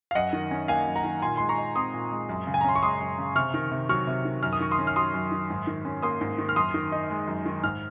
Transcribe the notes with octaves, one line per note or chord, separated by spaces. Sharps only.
F5
F#2 D#5 F#5
D#3
C#4
A#3 F5 G#5
F#2
F#5 A#5
D#3
A#2 G#5 C6
G#3 C6
A#5 C#6
D#4
C4 C6 D#6
A#2
G#3
F#2
C#3
G#5
A#5
C#4 C6
C#6
G#3 C6 D#6
F#2
C#3
C3 C#6 F6
D#3
C3
F#3 C#6 F6
C3
D#3
F#2 F6
D#6
D#3 C#6
C6 D#6
C#4
F6
F#3 C6 D#6
F#2
D#3
G#2
D#3
C#4
A#3 C6 D#6
G#2
D#3
F6
F#2 C6 D#6
D#3
D#4
G#3
F#2
D#3
G#2 F6